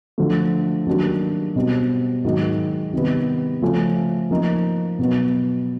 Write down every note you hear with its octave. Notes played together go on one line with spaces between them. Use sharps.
D3 F3 A3
D#3 F#3 A#3 D4 G4
B2 G3 C4
G#2 D#3 F#3
C3 D#3 G3 B3
C#3 F3 A3 C#4 F4
F3 A#3 D#4
B2 F#3 B3